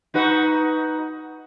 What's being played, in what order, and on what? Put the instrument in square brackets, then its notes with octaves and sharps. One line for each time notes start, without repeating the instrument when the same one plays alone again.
[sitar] D#4 F#4 B4